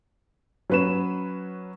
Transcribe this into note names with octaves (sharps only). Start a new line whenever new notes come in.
F#3 C#4 B4 B5 E7